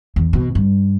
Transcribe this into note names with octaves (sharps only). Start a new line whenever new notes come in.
E2
B2
G2